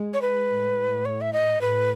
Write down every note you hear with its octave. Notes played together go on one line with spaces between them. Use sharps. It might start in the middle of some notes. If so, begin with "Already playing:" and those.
Already playing: G#3
C#5
B4
A2
C#5
E5
D#5
A2 B4